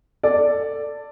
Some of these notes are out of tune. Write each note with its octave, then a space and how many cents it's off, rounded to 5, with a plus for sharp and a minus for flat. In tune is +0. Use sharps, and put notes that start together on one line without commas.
A4 +20 D5 +0